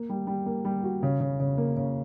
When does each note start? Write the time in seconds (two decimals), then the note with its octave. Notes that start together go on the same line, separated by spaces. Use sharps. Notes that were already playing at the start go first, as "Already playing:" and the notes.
Already playing: A#3
0.09 G3
0.27 G3
0.46 A#3
0.65 G3
0.83 F#4
1.03 C#3
1.20 C#3
1.40 C#3
1.58 A#3
1.77 C#3